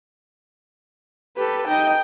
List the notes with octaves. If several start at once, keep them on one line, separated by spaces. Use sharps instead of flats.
G4 A4 B4
D#4 D#5 G5